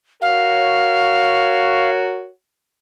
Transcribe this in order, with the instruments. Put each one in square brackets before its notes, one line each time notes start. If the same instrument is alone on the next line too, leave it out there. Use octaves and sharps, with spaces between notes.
[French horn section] F#4 A#4 C#5 [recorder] F5